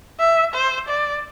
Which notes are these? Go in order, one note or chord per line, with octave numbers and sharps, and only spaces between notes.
E5
C5
D5